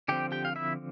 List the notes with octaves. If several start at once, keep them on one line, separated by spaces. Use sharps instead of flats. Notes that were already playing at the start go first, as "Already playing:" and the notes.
D3 F3 C4 G4 G5
G4 G5
F5
E4 E5